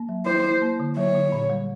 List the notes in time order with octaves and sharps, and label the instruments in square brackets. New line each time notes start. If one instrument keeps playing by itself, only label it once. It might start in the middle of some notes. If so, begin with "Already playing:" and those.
Already playing: [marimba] A#3
F#3
[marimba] E4 [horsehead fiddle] C5
[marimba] E4
A#3
D3
[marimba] F#3 [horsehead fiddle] C#5
[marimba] D3
A#2
G3